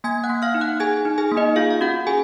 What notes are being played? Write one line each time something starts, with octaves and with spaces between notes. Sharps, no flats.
A#3 G#5 G#6
F#5 F#6
A#3
F5 F6
D#4
F#5 F#6
G#4 G#5 G#6
D#4
G#4 G#5
A#3
D#4 D#5
F4 G#4 F5
F5
C#4 F#4 F#5
G#4 G#5